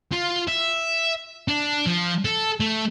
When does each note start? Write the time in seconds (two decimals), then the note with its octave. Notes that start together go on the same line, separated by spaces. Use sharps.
0.13 F4
0.48 E5
1.48 D4
1.86 F3
2.25 A4
2.60 A3